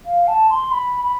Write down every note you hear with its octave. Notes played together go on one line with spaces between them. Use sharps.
F5
A5
C6
B5
B5